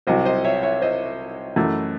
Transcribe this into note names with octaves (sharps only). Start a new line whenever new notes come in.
C2 C3 F#3 C5 D#5
C5 D#5
C#5 E5
C#5 E5
C5 D#5
F#2 E3 A3